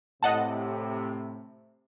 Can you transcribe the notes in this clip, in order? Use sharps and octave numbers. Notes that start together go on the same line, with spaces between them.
A2 C3 D#5 F#5 A5